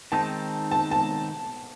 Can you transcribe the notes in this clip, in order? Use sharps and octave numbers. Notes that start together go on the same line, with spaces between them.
D#3 G#3 C4 D#4 A5
A5
A5